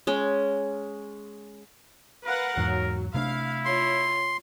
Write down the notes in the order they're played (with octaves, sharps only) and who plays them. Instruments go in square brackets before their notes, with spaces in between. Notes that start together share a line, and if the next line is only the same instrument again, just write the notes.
[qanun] G#3 C#4
[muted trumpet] A#4 [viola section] B4 F5 F#5
[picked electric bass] E2 G#2 [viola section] F#3
[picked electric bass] C3 A3 D4 [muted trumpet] E4 [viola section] F5
[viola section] F4 C#5 [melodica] C6